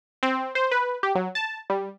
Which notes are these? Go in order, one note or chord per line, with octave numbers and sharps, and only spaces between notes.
C4
C5
B4
G4
F#3
A5
G3